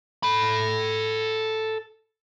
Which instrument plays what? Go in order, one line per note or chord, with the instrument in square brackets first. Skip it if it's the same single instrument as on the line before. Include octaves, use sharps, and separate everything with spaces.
[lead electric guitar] A4 B5